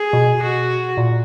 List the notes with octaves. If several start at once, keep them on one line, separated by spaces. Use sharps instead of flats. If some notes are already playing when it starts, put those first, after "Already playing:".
Already playing: G#4
B2
F#4
A#2